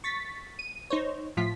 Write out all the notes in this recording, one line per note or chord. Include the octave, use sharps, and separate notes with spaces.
C#6 A6 B6
D#7
D#4 C5 C#5
A2 F3 F4 B6